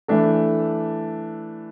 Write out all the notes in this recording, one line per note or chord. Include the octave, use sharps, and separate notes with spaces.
E3 A3 D4 A4